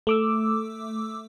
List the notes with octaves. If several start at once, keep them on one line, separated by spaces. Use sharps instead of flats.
A3 D6 E6